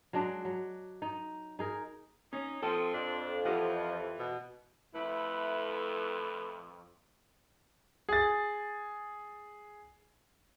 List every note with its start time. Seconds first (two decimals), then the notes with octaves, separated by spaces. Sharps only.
0.13 F#3 G#3 D4
0.45 F#3
1.02 D#4
1.59 D#4 G#4 A#4
2.33 C#4 D#4
2.63 F3 C4 A4 A5 C6 D#6
2.94 F2 D4
3.45 E3 F3 G4 D#5 F#5
4.19 B2
4.95 F2 A3 E4 B4
8.09 G#4 A6